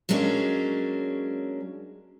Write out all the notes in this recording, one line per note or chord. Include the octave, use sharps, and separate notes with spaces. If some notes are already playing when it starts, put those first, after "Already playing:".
F#3 G#3 A#3 C#4 D4